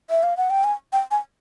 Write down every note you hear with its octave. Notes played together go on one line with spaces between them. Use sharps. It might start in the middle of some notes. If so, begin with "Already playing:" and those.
E5
F5
F#5
G5
G#5
G5
G#5